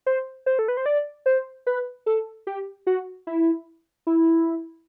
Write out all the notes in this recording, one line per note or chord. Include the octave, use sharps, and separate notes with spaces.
C5
C5
A4
B4
C5
D5
C5
B4
A4
G4
F#4
E4
E4